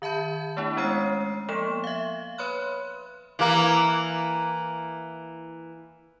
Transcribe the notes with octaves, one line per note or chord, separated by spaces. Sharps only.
D#3 E5 A5 B5 G6
A3 B3 D4 E4
G#3 C#4 C#5 F6 C7
F3 A#3 B3 E7
E5 F5
B4 C#5 B5 C6 F6 F#6
E3 A#3